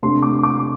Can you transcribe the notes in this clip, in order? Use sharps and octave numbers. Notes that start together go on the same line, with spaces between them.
C3 A3 D4 C6
D6
D6